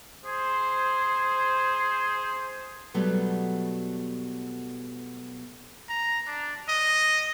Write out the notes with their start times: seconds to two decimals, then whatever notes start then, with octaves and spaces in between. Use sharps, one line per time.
0.25 G#4 C5
2.94 B2 F#3 G3 A3 B3
5.89 A#5
6.27 D4
6.69 D#5